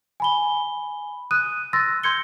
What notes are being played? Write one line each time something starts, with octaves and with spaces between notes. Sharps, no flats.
G#5 B5 G7
D#6 F#6 D#7
C6 E6 A6 A#6
C6 G6 G#6 C#7 G7